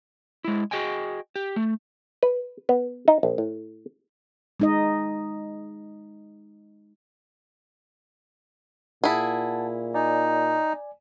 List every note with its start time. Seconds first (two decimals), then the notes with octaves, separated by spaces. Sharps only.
0.44 G#3 E4
0.71 F#4 G#4 D#5 G5 G#5
1.36 G4
1.56 A3
2.23 B4
2.69 B3
3.08 D#4
3.23 A#1
3.38 A2
4.60 G#3 D#4 D#5
9.04 A#2 E4 G#4 F#5 A5
9.94 D#4 D5 G#5